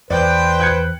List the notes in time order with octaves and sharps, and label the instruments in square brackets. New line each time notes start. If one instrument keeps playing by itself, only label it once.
[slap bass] E2 [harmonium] B4 C5 [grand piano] D5 [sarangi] G5
[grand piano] F#6 G#6 C#7